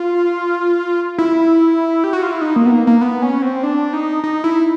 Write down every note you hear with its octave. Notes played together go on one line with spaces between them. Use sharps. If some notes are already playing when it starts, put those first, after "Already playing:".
Already playing: F4
E4
G4
F#4
F4
E4
D#4
A#3
B3
A#3
A#3
B3
C#4
C4
D4
D#4
D#4
E4